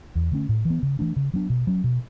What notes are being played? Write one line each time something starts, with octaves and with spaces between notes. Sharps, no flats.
E2
D3 A3 C#4
A2
E3
B3
C#3
E3 A3 D4
C#3
F#3 B3 D4
B2
F#3 C#4
B2